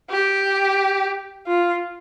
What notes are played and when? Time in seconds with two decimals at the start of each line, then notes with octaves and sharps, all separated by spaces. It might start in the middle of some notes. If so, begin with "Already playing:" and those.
0.10 G4
1.47 F4